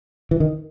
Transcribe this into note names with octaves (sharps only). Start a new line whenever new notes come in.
E3
D#3